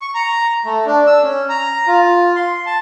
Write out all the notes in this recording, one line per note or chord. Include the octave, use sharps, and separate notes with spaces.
C#6
A#5
A3
D4
E6
C#4
A#5
F4
C6
A5